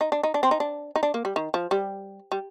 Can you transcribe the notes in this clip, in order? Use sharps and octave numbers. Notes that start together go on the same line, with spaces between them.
D#4
D4
D#4
D4
C4
D#4
D4
D#4
D4
A#3
G3
D#3
F3
G3
G3